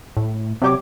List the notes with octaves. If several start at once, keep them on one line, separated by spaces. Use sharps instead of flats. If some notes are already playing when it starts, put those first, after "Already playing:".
A2
C3 F#3 G3 G4 C#5 D6